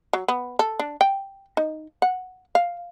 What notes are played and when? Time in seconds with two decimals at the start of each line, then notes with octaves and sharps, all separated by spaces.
0.13 F#3
0.28 B3
0.59 A4
0.79 D4
1.01 G5
1.57 D#4
2.02 F#5
2.55 F5